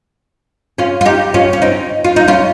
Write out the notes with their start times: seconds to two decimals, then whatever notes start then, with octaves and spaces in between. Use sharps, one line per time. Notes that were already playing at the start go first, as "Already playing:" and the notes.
0.78 C#4 F4
1.01 F4
1.05 D#4 G4
1.34 C#4 F4
1.53 C#4
1.62 C4 D#4
2.04 F4
2.16 D#4
2.28 C#4 F4